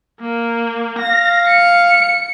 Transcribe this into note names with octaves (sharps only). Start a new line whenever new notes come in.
A#3
F5 A#6
C#7